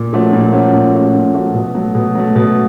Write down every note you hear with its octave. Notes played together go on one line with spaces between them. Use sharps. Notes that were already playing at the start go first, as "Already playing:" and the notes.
Already playing: A#2
F3 A3 C#4 F#4
A#2
F3 A3 C#4 F#4
A#2
F3 A3 C#4 F#4
A#2
F3 A3 C#4 F#4
B2
F#3 A3
B2
F#3 A3
B2